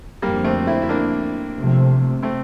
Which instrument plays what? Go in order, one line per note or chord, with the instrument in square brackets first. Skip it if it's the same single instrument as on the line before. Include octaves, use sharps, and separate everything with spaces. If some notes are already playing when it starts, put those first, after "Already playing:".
[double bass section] F2 D3 F3 [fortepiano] G3 A#3
[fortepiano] A3 C4
C4 E4
E4
A#3 D4
[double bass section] C3 F3 A3 C4
[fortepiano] A3 C4